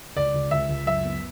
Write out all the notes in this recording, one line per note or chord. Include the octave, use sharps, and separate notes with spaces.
C#2 D5
C#2
C#2 E5
C#2
F#2 E5
B3